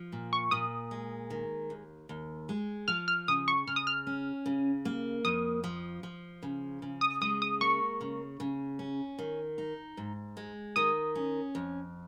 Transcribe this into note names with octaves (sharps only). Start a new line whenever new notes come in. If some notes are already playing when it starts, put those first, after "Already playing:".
Already playing: F3
A#2
C#6
A#2 D#6
G#3
D#3
D#2
D#2
G#3
F3 F6
F6
C#3 D#6
C#6
C#3 F6
D#6
F6
C#4
C#3
A#3
F2 D#6
F3
F3
C#3
C#3
D#6
G#3 D#6
D#6
A#3 C#6
C#3
C#3
C#4
D#3
D#4
G#2
G#3
D#3 D#6
C#4
F2